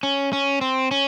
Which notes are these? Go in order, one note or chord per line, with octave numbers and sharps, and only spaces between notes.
C#4
C#4
C4
C#4